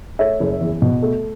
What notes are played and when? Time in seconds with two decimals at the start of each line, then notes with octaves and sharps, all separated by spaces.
0.19 A3 C#5 E5
0.40 F#1
0.61 E2
0.82 B2
1.02 A3